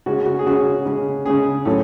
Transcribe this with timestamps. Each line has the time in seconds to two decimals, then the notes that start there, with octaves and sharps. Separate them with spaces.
0.06 C#3 G#3 C#4 F#4
0.26 F#4
0.39 G#4
0.46 C#3 G#3 C#4 F#4
0.86 C#3 G#3 C#4
1.25 C#3 G#3 C#4 G#4
1.65 A2 F#3 C#4 A4